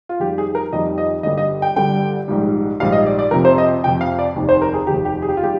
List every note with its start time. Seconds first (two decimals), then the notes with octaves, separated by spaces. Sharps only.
0.09 F4
0.20 F2 D#3 G3 G4
0.38 G#4
0.55 A#4
0.73 F2 D#3 G3 D#5
0.98 D#5
1.23 G1 G2 D3 G3 D#5
1.38 D#5
1.62 G5
1.76 G1 G2 D3 G3 G5
2.28 A#1 G#2 D#3 G3
2.80 A#1 G#2 D#3 G3 F5
2.92 D#5
3.06 D5
3.19 D5
3.31 F2 C3 F3 A#4
3.45 C5
3.58 D#5
3.84 F2 C3 F3 G5
4.01 F5
4.19 D5
4.35 F1 D#2 D#3
4.49 C5
4.62 A#4
4.74 G#4
4.87 F1 D#2 D#3 G4
5.05 G4
5.22 G#4
5.29 G4
5.37 F4
5.40 D#3 G3 G4